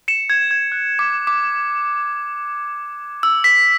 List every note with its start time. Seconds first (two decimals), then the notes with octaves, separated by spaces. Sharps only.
0.08 C#7 E7
0.30 G#6
0.51 G#6
0.72 F#6
0.99 D6
1.27 D6
3.23 E6
3.44 B6